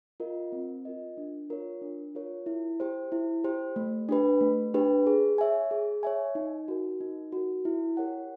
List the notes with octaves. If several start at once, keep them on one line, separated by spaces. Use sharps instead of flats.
F4 A#4 D#5
C4
F4 A#4 D#5
D4
F4 A#4 C#5
D4
F4 A#4 C#5
E4
G4 C5
E4
G4 C5
A3
D4 G4 B4
A3
D4 G4 B4
G#4
C#5 E5 G#5
G#4
C#5 E5 G#5
D#4
F#4 A#4
D#4
F#4 A#4
E4
G4 A#4 C#5 F#5